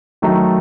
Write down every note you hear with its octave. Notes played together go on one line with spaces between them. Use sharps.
D#3 F#3 A3 D#4